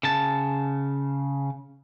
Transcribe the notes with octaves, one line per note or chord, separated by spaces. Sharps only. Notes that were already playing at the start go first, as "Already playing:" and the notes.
C#3 A5